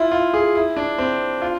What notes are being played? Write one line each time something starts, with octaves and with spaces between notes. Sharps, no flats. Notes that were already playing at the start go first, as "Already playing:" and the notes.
Already playing: E4 F4
F4
G#4
E4
D4
C4
F4